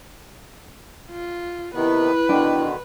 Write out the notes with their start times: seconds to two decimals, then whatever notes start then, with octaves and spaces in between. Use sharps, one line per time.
1.11 F4
1.75 C3 D#3 B3 E4 B4
2.29 B2 D3 D#3 D4 G5